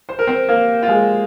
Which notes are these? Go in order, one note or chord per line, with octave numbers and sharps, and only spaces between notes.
C5
A#4
C4 C5
A#3 A#4
F4
G#3 G#4